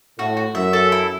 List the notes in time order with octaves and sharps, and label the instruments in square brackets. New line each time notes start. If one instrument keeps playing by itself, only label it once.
[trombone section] A2 [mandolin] F#4
[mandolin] F#4
[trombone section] F#2 [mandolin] E5
[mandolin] A4
E4